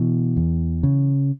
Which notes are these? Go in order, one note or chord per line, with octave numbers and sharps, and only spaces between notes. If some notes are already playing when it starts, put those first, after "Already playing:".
Already playing: B2 E3
E2
C#3